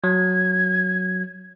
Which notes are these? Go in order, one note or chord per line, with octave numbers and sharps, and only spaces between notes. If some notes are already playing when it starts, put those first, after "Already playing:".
F#3 G#6